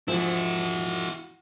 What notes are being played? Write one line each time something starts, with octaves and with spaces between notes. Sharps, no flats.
E2 G#2 F3 E4 F#4